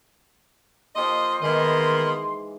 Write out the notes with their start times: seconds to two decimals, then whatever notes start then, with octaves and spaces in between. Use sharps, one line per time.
0.95 F3 A#3 G4 D#5 C6
1.42 G#2 D#3 E3 G#3 A#3 B3 D#5